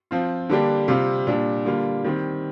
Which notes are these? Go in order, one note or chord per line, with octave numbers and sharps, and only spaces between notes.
F3 C4 F4
D3 G3 A#3 D4 G4
C3 G3 C4 F4
A#2 G3 D4
D3 G3 A#3 F4
D#3 G3 C4